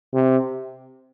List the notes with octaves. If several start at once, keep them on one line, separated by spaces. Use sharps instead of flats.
C3